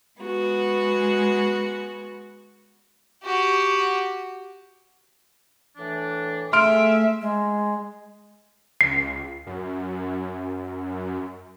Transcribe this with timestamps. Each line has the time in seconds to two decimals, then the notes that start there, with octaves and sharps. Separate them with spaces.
0.20 G#3 B3 F#4
3.23 F#4 G4
5.76 A2 E3 D4
6.53 A3 G#4 E5 F5 C6 F6 D7
7.21 G#3
8.81 C#2 C7
9.47 F#2